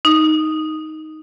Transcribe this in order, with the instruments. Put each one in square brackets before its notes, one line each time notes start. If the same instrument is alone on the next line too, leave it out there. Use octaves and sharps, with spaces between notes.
[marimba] D#4